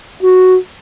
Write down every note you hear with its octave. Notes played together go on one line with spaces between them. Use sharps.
F#4